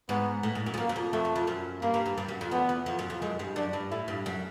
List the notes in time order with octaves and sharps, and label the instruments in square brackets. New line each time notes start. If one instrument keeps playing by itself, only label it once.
[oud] G#2 [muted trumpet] B3
[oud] A2
G#2
F#2
F2
[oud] F#2 [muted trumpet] A#3
[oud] F#2
F2
[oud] F2 [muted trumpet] A3
[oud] F2
F2
F#2
[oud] G2 [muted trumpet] A#3
[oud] G2
G2
G2
F#2
F2
[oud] E2 [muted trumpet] B3
[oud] E2
F2
F#2
F2
[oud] F#2 [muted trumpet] G#3
[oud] G2
[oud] F#2 [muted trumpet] D4
[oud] G2
[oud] A2 [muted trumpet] E4
[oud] G2
F#2